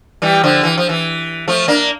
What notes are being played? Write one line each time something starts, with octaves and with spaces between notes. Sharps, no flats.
E3 G3
D3 F3
E3
F3
E3
F3 A3
A#3 D4